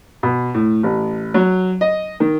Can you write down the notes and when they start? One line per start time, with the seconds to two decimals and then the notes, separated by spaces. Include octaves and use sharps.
0.23 B2
0.54 A2
0.83 A1
1.34 F#3
1.81 D#5
2.20 D#3